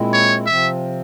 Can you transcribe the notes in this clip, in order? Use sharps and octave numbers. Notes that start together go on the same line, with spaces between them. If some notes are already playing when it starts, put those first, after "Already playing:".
Already playing: A#2 G#3 C4 E4
C#5
C3 F3 C4 E5